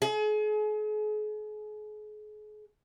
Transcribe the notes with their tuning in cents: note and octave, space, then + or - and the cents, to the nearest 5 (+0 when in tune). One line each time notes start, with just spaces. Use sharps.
G#4 +40